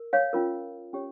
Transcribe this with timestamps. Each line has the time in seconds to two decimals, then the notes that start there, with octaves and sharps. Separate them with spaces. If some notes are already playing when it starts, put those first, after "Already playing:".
Already playing: A#4
0.13 C#5 F5
0.33 C#4 F4 A#4
0.93 C#4 G4 C#5